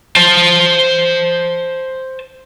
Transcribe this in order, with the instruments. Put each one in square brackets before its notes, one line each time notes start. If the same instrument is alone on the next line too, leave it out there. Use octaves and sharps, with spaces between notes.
[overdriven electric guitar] C5 A5